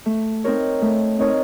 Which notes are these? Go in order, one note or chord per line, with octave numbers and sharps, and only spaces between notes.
A3
C4 D#4 A#4 C#5
A3
C4 D#4 A#4 C#5